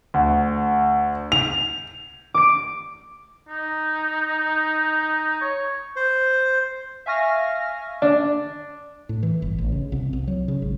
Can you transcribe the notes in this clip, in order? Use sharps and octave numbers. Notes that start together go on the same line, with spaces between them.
D2
F7
D6 D7
D#4
C#5
C5
E5 F5 G#5 C#6 F6 A#6
D4
A2
E3
G1
A1
C#3
C2
C2
F#3
C#3
G#1